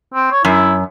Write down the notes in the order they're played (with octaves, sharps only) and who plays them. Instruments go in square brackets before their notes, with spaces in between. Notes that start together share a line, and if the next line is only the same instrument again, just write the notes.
[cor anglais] C4
C#5
[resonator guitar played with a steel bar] F#2 [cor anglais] E4